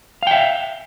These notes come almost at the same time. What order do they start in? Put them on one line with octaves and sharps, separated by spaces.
F5 G5 E5